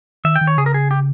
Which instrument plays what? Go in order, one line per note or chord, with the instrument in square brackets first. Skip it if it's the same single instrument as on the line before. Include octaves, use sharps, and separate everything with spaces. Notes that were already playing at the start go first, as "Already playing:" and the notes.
[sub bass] D#3 [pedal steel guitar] E5
[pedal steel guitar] G5
[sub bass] D#3
[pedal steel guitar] C#5
[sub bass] C#3 [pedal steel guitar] G#4
[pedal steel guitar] A#4
G#4
G4